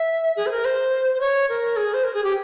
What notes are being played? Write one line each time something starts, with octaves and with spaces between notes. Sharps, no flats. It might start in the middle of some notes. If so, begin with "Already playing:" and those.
Already playing: E5
G#4
C5
A#4
C5
C5
C#5
A#4
G#4
C5
A#4
G#4
G4